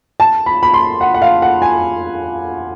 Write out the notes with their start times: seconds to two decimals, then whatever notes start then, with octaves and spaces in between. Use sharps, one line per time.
0.20 A5
0.46 B5
0.63 B5
0.74 C6
1.01 F#5
1.14 F#5
1.22 F5
1.42 F#5
1.62 G#5